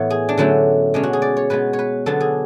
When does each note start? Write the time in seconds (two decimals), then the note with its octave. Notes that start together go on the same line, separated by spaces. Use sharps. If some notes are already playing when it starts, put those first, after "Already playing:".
Already playing: A2 E3 B3 C#5
0.10 G#4
0.29 D4
0.38 D3 F#3 A3 C#4 E4
0.94 B2 G#3 C#4 D4
1.03 F#4
1.13 G#4
1.22 D5
1.37 C#5
1.50 B2 G#3 B3 B4
1.73 C#5
1.79 B4
2.06 D3 F#3 B3 D4 A4
2.20 G#4